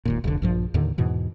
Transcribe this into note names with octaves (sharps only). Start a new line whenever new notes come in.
E1 D#2 A#2
F1 C2 D3
A#1 G2 F3
D#2 A2 D3 D#3
E2 G#2 B2 E3